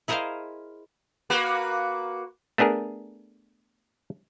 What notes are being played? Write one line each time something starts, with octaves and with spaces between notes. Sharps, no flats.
E4 G#4 A#4 C5 D#5 F5
A#3 F#4 B4
A3 B3 D4 G#4 A#4